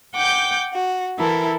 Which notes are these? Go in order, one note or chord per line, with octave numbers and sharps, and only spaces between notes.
F#5 G5 D6 G6
F#4
E3 E4 A4 A#4